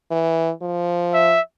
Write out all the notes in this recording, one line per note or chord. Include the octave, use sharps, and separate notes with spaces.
E3
F3
E5